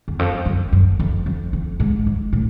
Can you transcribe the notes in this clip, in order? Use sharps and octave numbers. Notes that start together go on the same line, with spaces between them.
E2
F2
F#2
F#2
F2
F2
F2
G#2
G#2
A2